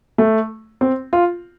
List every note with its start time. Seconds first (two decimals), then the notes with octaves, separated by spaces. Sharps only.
0.18 A3
0.81 C4
1.13 F4